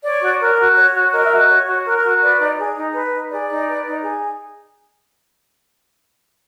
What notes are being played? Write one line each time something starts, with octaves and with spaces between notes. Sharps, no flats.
C#5 D5
F#4
A#4
F#4
C#5
F#4
A#4 D#5
E5
F#4 D#5
C#5
F#4
A#4
F#4
B4 D5
D#4
G#4
D#4
B4
D#4
G#4 D5
D#4
B4
D#4
G#4